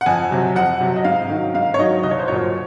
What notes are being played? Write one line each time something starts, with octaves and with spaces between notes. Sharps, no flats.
F#5
F2 G#5
C3 F#3
F2 F#5
C3 F#3
D#5
G#2 F5
D#3 F#3
G#2 F5
C#5
D#3 F#3 D#5
C2 D#5
C#5
C5
A#2 F#3 C#5